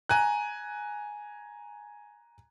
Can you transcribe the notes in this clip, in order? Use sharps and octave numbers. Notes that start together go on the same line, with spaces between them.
G#5 A#5 F#6